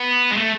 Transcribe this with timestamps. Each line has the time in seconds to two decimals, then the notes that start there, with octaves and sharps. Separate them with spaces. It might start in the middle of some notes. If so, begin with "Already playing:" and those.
Already playing: B3
0.31 G#3
0.37 A3